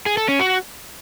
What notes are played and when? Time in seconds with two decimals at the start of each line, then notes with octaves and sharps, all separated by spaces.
0.06 G#4
0.17 A4
0.28 C#4
0.40 F#4